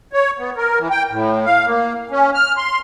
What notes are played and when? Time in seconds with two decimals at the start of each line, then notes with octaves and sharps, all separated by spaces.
0.13 C#5
0.39 B3
0.57 A#4
0.79 E3
0.91 G5
1.11 A2
1.46 F5
1.66 A#3
2.11 C#4
2.34 F6
2.57 C6